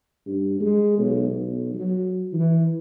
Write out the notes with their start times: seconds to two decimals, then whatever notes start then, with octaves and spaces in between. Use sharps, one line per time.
0.26 G2
0.60 G#3
0.98 B1
1.30 B1
1.74 F#3
2.33 E3